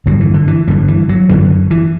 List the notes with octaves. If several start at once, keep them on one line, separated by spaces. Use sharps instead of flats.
G2 D3 F#3
E3
D3
E3
G2 D3 G3
E3
F#3
F#2 D3 E3
E3